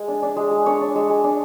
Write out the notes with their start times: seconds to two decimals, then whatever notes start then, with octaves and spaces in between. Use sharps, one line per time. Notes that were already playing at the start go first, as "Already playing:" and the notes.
Already playing: G#3 E5
0.08 D4
0.23 D4
0.37 G#3
0.51 G#3
0.66 D4 C#5
0.81 D4
0.95 G#3
1.10 G#3
1.24 D4